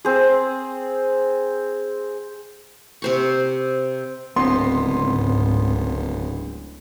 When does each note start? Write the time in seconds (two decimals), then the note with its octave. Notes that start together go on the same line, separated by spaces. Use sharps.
0.05 C4 G#4
3.02 C3 C5 C#6
4.36 D1 C#2 G#2 B3 C4 C6